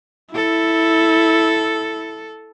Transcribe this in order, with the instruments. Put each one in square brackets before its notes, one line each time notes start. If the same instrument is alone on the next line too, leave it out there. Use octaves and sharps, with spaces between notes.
[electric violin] E4 [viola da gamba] A4